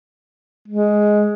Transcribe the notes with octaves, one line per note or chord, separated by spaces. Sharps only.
G#3